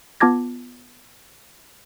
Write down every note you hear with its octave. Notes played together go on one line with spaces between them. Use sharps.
B3 F4 A5 D6 G#6 A#6